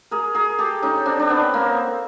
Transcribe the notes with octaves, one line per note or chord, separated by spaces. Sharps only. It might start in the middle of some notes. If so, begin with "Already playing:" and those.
G#4 A#4
G#4 A#4
G4 A4
C#4 D#4
C4 D4
D4
B3 C#4
A#3 C4